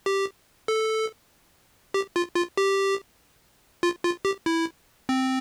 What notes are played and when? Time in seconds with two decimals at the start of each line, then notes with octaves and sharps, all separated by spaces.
0.06 G4
0.68 A4
1.94 G4
2.16 F4
2.36 F4
2.57 G4
3.83 F4
4.04 F4
4.25 G4
4.46 E4
5.09 C4